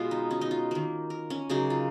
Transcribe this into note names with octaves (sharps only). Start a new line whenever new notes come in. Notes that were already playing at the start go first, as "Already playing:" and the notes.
Already playing: B2 G#3 B3 F4
D#4
C#4
D#4
F4
D#3 A#3
A#4
C#4
C#3 F#3 A#3 D#4
F4